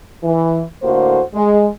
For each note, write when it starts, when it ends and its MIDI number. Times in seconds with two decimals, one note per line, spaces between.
0.23 0.63 52
0.82 1.20 45
0.82 1.20 50
0.82 1.20 58
0.82 1.20 66
0.82 1.20 72
1.35 1.67 56